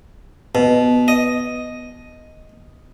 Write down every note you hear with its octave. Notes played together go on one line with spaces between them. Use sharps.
B2
D#5